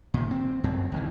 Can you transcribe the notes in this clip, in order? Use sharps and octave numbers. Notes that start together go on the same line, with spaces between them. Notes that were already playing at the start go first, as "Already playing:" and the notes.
A#2 D#3
C4
F#2 C4
C#2 D#3 E3